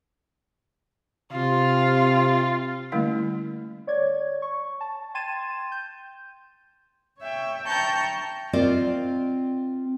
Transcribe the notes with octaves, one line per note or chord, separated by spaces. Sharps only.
C3 F4
D3 G3 A3 A#3 C#4 E4
C#5 D5 G#6
C#6
A5
G5 C6 G#6 A6 D#7 E7
G6
C#5 E5 G5
G5 A5 A#5 C#6 G6
C4 F4 A#4 D5 D#5 F5